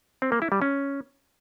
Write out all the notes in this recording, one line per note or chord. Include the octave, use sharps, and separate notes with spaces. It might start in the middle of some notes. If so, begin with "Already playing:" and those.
C4
A#3
E4
G3
C#4